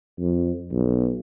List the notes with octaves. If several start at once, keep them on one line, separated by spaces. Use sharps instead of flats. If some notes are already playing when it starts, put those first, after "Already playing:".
F2
B1